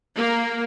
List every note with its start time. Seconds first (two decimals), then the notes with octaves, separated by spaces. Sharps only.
0.16 A#3